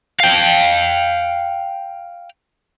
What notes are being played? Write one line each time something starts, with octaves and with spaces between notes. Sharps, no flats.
F5 G5